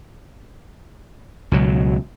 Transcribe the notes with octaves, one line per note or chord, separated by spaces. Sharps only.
C#2 B2 F#3